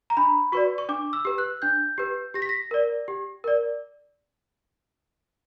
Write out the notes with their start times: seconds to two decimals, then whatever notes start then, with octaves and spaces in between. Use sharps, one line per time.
0.10 A#5
0.17 D4 B5
0.52 F#4 B4 D5 C#6
0.78 C#6
0.89 D4 D6
1.13 E6
1.25 G4 B4
1.38 F#6
1.62 D4 G6
1.98 G4 B4
2.34 G4 A#6
2.42 B6
2.49 A#6
2.71 A#4 D5
3.08 G4
3.44 A#4 D5